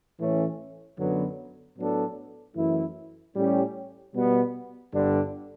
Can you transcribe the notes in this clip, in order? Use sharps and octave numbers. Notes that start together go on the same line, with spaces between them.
A2 E3 A3 C#4
F#2 D3 F#3 B3
A2 F#3 B3 D4 A4
F#2 E3 A3 E4
A2 G3 C#4 G4
B2 G3 B3
G1 G2 D3 G3 D4